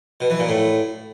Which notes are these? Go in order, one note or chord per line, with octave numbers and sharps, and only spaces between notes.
B2
E3
A#2
A2